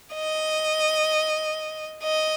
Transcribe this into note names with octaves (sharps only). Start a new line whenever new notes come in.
D#5
D#5